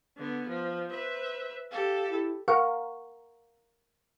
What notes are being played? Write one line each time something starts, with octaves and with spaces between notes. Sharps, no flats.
D3 B3
F3 C5
B4 E5
G4 A4 F5
E4
A#4 F5 F#5 C#6